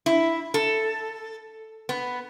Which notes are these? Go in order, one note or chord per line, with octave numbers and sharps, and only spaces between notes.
E4
A4
B3